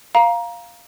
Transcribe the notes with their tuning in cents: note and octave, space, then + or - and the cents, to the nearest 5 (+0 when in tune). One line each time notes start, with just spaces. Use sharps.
F5 +0 A#5 +15